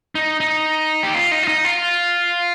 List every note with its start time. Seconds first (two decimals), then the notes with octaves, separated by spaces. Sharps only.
0.15 D#4
0.40 D#4
1.03 G4
1.14 F4
1.31 D#4
1.43 F4
1.48 D#4
1.64 F4